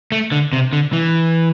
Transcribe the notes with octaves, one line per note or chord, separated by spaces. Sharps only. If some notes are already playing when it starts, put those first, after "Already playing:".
A3
D3
C3
D3
E3